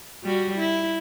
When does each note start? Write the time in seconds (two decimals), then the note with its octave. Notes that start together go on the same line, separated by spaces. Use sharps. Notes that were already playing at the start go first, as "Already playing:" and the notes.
0.24 G3 F#4
0.58 E4